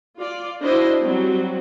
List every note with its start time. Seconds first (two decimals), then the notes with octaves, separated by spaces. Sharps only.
0.19 F4 D5
0.63 D4 E4 F#4 C5 D#5
1.02 F#3 G3 C4